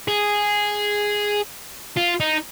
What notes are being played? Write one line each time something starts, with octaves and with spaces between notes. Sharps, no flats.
G#4
F4
D#4